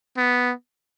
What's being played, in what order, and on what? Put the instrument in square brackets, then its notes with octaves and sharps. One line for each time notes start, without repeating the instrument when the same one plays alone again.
[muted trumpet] B3